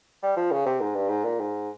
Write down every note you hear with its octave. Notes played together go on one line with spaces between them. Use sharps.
G3
F3
C#3
C3
G#2
G2
G#2
A#2
G#2